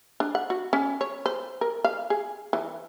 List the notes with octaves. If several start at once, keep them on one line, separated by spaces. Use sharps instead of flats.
D4
F#5
F#4
C#4
C#5
C5
A#4
F5
G#4
E3